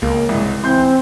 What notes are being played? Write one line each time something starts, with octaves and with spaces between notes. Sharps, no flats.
C#2 A#3
C2 G#2
E3 C4 C6 G6